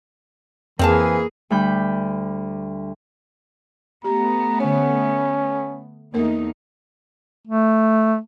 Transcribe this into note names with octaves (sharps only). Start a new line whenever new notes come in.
F2 E3 A#3 C4 G#4 F5 A5
D2 G3 B5 G6
A3 B3 G4 A#5
D3 C#4 C#5
E2 A3 A#3 D#4 A#4
A3